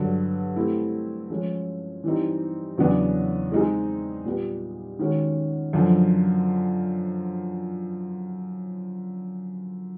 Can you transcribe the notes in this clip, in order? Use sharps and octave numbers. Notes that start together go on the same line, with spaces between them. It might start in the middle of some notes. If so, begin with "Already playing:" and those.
Already playing: G2 D3 F#3
A3 C4 E4 G4
F3 G#3 C#4
E3 G3 C4 D#4
E2 C#3 F#3 B3 D4
G#3 C4 D#4 G#4
A#2 G3 B3
D#3 G#3 C#4 F#4
F#2 D3 F3